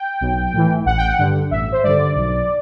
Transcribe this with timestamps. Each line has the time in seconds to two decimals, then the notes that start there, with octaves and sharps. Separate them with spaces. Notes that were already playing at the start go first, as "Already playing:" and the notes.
Already playing: G5
0.21 B1
0.53 A2 E3
0.85 A1 F#5
0.97 G5
1.07 F#5
1.18 G2 D3
1.51 A1 E5
1.72 C5
1.83 G2 D3 D5
2.15 B1